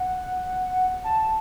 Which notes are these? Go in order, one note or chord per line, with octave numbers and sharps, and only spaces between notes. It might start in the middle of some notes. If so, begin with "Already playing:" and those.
Already playing: F#5
A5